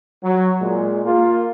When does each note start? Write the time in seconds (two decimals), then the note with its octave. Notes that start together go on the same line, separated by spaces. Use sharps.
0.23 F#3
0.61 A#2 G#3
1.05 A#3 F4